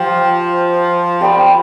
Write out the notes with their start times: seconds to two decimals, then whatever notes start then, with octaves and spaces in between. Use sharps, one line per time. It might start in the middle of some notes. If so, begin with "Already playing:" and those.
Already playing: F3 G4 C5 G5
1.21 G4 D5 G5 B5